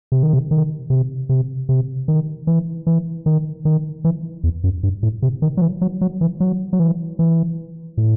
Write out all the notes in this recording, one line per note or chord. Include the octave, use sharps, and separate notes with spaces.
C3
D#3
C3
D#3
C3
C3
C3
D#3
E3
E3
D#3
D#3
E3
E2
F#2
G2
A2
C3
D#3
F#3
E3
F#3
F#3
E3
F#3
F#3
E3
E3
A2